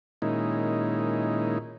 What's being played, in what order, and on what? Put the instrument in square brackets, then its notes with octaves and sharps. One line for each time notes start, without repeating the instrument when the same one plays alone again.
[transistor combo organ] A#2 D#3 G#3 C#4 D#4 E4